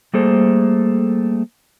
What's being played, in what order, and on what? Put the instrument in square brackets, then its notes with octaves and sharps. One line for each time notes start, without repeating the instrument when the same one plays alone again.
[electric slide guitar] G3 A3 A#3 G#4 A4 C5